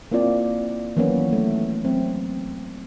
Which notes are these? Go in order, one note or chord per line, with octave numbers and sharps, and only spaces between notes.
A#3 C4 E4 F4 D5
D#3 E3 F#3 A#3 B3 C#4
A3
F#3 C4